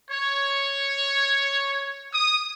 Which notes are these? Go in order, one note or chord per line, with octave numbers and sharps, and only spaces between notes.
C#5
D#6